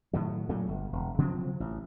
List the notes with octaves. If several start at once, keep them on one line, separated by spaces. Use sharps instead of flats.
A2 D#3 F#3
A#2 F#3 A3
G1
E1
C#3 F3 F#3 C4
A1